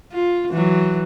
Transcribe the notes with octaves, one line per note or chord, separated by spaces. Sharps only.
F4
E3 F#3